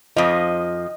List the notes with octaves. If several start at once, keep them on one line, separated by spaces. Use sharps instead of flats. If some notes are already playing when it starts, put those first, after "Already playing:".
F2 F3 D#5